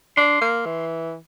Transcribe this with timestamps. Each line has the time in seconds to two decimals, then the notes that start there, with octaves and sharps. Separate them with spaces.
0.17 D4 C6
0.41 A#3
0.65 E3